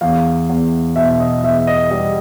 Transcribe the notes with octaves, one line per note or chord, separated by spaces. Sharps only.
E2 F5
E2
B2 E5
D#5
E2 E5
D#5
G3 D#5